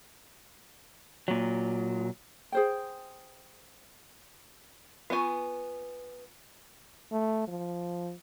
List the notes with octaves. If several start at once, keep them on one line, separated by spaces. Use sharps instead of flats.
A#2 F#3
G#4 C5 G5
B3 F4 G#5 C#6
A3
F3